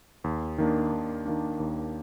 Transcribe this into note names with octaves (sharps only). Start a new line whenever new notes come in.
D#2
D#3 A#3 D4
D#2
D#3 A#3 D4
D#2